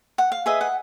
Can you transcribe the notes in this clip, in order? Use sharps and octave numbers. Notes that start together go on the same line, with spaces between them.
F#5
F5
G#4 B4 D#5 E5
F#5